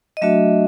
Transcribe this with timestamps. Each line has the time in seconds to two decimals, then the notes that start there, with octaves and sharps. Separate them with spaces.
0.17 D#5
0.22 F#3 A3 D4 F#4 E5